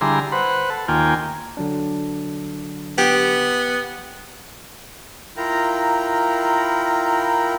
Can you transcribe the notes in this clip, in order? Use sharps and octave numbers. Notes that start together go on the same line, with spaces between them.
D3 G3 E4 G#4 A#5 C6
B4 C5 F#5
A4
D#2 A#3 F4 G5 G#5
D3 F#3 D4
B3 G4
E4 F4 A#4 G5 A#5